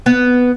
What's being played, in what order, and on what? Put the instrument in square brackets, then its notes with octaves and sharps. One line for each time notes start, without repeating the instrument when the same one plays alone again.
[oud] B3